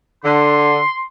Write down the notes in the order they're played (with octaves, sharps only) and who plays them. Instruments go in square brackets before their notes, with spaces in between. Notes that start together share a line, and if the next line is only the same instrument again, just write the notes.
[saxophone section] D3 [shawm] C6